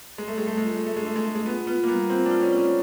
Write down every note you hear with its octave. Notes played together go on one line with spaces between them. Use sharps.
G3 G#3
A3
G3 G#3
A3
G#3 F4
A3
G#3
A3 A#3
G#3
A3 D4
G#3
A3 D4
G#3
B3 F4
B3 F4
A#3
G3 B3
C4 F4
D4
F4
C#4
F4
C#4